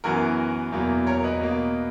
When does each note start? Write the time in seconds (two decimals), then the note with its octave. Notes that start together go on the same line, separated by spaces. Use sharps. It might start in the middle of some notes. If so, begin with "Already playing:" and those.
0.04 F#2 E3 B3 F#4 A#4
0.72 E2 B2 F#3 A#3
1.07 A#4 C#5
1.24 B4 D#5
1.41 B2 A#3